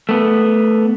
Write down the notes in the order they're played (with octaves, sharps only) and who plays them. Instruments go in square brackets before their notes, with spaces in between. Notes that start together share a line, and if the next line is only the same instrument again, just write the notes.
[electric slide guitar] A3 B3